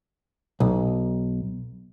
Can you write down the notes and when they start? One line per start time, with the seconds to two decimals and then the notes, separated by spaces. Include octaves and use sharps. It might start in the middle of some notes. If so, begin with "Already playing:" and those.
0.60 B1